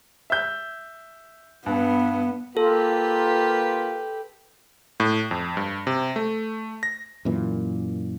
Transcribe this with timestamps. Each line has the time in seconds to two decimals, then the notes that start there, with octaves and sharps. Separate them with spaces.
0.30 E5 G6
1.66 G2 B3
2.57 A#3 F4 G4 A4 B4
5.00 A2
5.31 F2
5.57 G2
5.87 C3
6.16 A3
6.83 A#6
7.25 F#2 A#2 E3